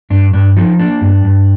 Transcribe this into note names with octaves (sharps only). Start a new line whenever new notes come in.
G2 D4
G2 D4
F3 D#4
A#3 D4
G2
G2